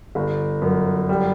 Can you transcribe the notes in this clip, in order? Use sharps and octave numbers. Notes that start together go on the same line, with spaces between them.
G1
F#2
G3